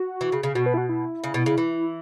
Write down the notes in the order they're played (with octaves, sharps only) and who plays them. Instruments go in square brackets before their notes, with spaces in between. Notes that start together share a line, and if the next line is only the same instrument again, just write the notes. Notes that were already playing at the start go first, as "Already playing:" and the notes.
Already playing: [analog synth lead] F#4
[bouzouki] E3
C#3
C#3
[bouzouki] B2 [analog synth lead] F#4
[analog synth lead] B4
E4
F#4
E4
[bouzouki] C#3
B2
C#3
E3